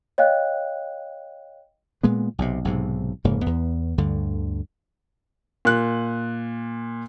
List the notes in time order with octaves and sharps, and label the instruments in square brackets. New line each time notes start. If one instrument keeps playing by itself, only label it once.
[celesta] C#5 D#5 F5 G5 F#6
[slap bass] A#2 G#3 B3
B1 C3
B1 G#2 C3
F1 G#2 C#3 A#3
E2 B3
D2 G2 D3
[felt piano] A#2 F#6